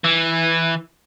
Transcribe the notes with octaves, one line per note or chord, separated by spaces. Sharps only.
E3